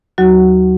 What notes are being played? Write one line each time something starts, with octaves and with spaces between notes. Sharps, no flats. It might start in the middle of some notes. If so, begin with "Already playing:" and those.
D#2 F#3 F#4